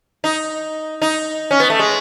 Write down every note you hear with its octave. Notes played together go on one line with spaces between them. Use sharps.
D#4
D#4
C#4
B3
A3
G#3